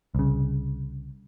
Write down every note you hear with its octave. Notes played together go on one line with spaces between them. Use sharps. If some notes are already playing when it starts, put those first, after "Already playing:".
C2 C#3